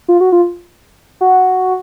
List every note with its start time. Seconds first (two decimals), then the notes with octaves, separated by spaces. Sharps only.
0.08 F4
0.21 F#4
0.32 F4
1.21 F#4